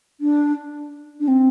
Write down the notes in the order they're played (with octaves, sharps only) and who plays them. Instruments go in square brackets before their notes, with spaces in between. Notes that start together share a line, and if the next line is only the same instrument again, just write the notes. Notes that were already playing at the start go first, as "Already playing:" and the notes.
[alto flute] D4
D4
C4